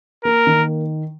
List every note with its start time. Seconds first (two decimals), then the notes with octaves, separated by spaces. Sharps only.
0.25 A#3 A#4
0.47 D#3